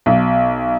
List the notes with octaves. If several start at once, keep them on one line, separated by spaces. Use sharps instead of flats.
B1